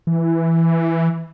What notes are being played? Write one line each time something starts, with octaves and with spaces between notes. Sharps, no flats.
E3